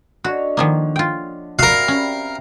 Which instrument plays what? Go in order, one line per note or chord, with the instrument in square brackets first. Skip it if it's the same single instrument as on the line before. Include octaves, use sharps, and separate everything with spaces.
[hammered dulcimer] D3 C#5 D#5 [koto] F#4
[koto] D#3 F3 A#3
F4 G5
[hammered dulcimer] C3 G3 [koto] F#4 [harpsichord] A#4 F5
[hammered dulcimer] G3 [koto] C#4